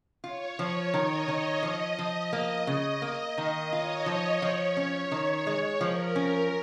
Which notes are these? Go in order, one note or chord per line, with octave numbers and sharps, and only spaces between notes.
F4 C#5
F3
D#3 D#5
D#3 C#5
F3 D#5
F3
A#3
C#3
A#3
D#3
F4 C#5
F3
F3
C#4
D#3
G#3
F3 A#4
C#4